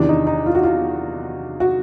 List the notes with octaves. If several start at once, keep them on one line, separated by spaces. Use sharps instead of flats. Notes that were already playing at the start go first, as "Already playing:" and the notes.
Already playing: E2 C3 D#3 D4
D#4
D#4
F4
F#4
F4
F#4